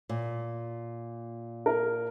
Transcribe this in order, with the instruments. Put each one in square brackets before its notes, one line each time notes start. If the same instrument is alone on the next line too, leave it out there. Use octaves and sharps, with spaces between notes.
[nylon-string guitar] A#2
[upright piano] A#4